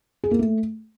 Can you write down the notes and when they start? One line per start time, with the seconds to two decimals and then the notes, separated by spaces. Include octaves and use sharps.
0.24 G#4
0.31 A#3
0.39 A3